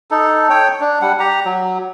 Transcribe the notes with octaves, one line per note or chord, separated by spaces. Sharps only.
D#4 A4
C#5 G5
D4
G3 F#5
G4 A#5
F#3